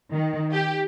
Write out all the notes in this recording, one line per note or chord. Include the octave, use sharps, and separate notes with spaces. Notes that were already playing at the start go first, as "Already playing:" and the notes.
D#3
G4